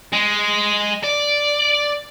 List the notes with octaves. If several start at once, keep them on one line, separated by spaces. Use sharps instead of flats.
G#3
D5